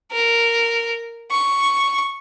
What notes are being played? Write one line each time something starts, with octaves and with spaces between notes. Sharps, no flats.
A#4
C#6